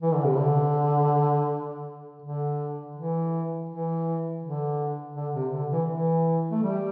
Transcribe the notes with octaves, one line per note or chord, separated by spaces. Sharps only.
E3
D3
C3
D3
D3
E3
E3
D3
D3
C3
D3
E3
E3
A3
G3